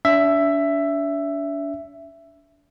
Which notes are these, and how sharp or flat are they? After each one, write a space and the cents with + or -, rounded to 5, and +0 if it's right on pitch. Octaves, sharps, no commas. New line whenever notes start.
D4 -35 E5 +10